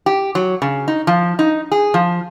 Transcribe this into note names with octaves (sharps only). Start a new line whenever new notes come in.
G4
F#3
C#3
D#4
F3
D#4
G#4
F3